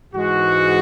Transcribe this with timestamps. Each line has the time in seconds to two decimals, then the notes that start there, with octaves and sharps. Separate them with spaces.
0.14 G#2 E3 G#3 F#4